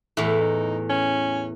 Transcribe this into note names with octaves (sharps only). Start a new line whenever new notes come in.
E2 A2 E4
D#4
C#4